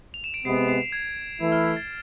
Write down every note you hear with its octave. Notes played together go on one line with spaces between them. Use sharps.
F7
E7
D7
C3 G#3 B3 C7
D7
C7
G#6
E3 A3 E4
F6
G#6
A6